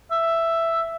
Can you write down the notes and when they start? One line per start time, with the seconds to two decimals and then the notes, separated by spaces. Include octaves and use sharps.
0.11 E5